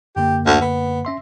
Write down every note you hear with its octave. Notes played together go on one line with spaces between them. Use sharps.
F#2 D3 A#3 G4
D2
B3
C#4 E5 C6